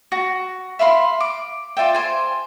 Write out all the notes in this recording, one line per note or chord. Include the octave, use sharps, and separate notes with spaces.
F#4
E5 F5 B5 C6
D6
F4 D5 E5 G5
C5 G#5